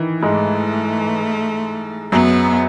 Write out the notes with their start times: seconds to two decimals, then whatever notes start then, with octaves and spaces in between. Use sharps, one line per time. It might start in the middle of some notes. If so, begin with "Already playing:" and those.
Already playing: D#3 E3
0.22 G#2 G#3 A3
2.12 F#2 F#3 B3